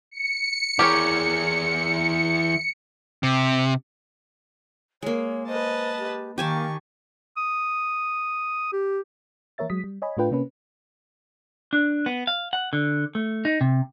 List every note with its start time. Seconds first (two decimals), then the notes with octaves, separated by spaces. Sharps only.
0.11 C#7
0.79 E3 G4 G#4 A#4 C#5
3.23 C3
5.03 G#3 A#3 C#5
5.48 B4 C5 D#5 A5
5.98 G4
6.38 D#3 A#3 G4 G#5 A5 C#6
7.37 D#6
8.72 G4
9.58 E3 A#3 A#4 C#5 E5 A6
9.70 F#3 G#3 D#6 B6
9.84 G3
10.02 C#5 D#5 G#5 B5
10.17 A2 A3 D4 F4 B4 G5
10.31 C3 A#3 C#4 B4
11.73 D4
12.06 B3
12.27 F5
12.53 F#5
12.73 D3
13.15 A3
13.45 D#4
13.61 C3